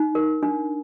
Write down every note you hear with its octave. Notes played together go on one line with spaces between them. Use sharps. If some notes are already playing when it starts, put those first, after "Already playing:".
Already playing: D#4
A#4
D4